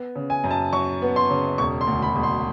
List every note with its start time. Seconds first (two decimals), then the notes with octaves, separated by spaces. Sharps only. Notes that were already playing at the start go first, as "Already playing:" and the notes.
Already playing: B3
0.16 C#3
0.30 G#5
0.44 F#2
0.51 A5
0.73 F#3 C#6
1.02 B3
1.16 C6
1.30 C#3
1.58 E1 C#6
1.81 C6
1.87 D2
2.02 B5
2.16 E1
2.23 C6